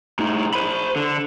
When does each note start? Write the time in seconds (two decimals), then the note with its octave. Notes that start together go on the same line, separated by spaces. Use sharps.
0.19 A2 D#4
0.54 C5 B5
0.96 D3